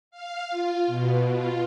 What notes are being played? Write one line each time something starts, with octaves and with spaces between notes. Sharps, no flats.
F5
F4
B2
F4